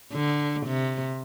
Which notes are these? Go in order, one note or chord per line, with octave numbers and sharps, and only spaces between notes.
D3
C3